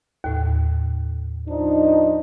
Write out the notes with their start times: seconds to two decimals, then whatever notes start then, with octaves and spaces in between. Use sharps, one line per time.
0.24 D#2 A2
1.48 F3 D4 D#4